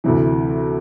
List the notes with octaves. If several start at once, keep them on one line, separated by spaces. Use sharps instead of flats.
D2 C3 E3